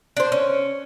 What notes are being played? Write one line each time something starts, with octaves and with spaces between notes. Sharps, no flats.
D4 C5
C#4